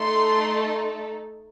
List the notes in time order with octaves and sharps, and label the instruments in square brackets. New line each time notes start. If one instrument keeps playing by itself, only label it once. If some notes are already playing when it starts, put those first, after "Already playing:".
Already playing: [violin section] A3 D#4 A4 C6